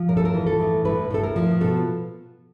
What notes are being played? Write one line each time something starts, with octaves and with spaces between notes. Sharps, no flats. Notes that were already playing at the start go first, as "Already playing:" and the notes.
Already playing: F3
A2 A#4
A4
A#4
E3
A4
A2
A2 B4
A2 A4
A#4
F3
B2 A4